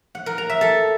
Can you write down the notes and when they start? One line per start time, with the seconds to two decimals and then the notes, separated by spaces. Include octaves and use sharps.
0.15 F#5
0.26 A#4
0.38 A#5
0.49 E5
0.61 A4